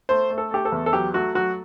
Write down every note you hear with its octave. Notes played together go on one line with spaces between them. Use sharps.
A3 C5
A3
A4
A3 G4
A4
E2
A4
F#3 G4
A3 F#4
F#3 F#4